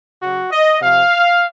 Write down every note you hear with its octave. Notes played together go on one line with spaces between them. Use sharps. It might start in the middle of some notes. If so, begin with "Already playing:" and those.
C#3 F#3 F#4
D#5
C3 F3 F5